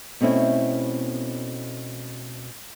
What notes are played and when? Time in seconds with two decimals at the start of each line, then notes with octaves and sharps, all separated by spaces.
0.21 B2 A3 C4 C#4 E4